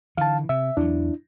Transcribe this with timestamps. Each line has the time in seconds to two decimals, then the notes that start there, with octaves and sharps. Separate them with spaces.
0.17 D3 E3 F5 A5
0.49 C3 E5
0.77 E2 F#3 D4 E4